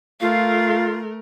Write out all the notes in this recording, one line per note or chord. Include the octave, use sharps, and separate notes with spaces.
A3 F4 A#4 F5